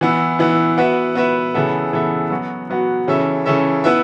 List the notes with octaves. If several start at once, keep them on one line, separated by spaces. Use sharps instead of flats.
E3 B3 E4
E3 B3 E4
B3 F#4 B4 E5
B3 F#4 B4 E5
C#3 E3 B3 A4 E5
C#3 E3 B3 A4 E5
F#3 B3 F#4
F#3 B3 F#4
C#3 E3 C#4 A4 E5
C#3 E3 C#4 A4 E5
B3 E4 B4 E5